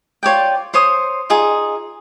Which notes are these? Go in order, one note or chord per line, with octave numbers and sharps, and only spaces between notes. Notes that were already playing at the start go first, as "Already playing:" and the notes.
F4 C#5 D5 G5
C5 C#5 C6 D#6
D#4 F4 G#4